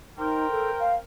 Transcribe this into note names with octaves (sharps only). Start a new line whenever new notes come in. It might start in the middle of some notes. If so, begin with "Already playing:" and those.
D#4 A#4 C5 G5
A4
F5